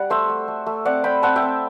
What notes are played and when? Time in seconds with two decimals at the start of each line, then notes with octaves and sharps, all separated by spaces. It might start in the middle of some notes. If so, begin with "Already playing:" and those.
Already playing: G3 D5 F#5
0.10 A3 C5 E5
0.29 A3
0.48 A3
0.66 A3
0.85 C4 D5 F#5
1.04 C4 G5 B5
1.22 C4 F#5 A5
1.36 E5 G5
1.42 C4